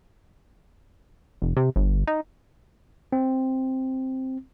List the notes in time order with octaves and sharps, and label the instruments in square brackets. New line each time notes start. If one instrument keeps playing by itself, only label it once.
[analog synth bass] F1
C3
G1
D#4
[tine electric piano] C4